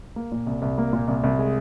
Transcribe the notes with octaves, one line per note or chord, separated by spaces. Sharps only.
A#3
A#2
C2
C2
A#3
A#2
C2
C2
G#3